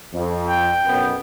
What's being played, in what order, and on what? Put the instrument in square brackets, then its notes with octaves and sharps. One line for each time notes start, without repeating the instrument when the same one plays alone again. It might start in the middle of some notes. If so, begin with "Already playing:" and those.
[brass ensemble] F2
[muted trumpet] G5
[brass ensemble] B1 F#2 B3